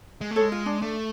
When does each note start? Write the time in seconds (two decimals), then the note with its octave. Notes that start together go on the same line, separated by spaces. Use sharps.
0.21 G#3
0.31 A3
0.36 G#3 A4 C#5
0.52 F4
0.66 D4
0.81 A3 D4